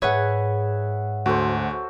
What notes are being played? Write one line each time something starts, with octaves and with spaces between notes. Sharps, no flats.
G#2 G#4 B4 C#5 E5 F#5
D2 F#4 A4 C5